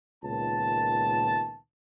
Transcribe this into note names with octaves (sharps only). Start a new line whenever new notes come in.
C#2 A#2 D#3 B3 A5